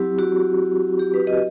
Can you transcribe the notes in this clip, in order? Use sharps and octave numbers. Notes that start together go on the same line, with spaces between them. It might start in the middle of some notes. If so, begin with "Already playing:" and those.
Already playing: F#3 C4 E4 G4
F#4
G4
B4
D#5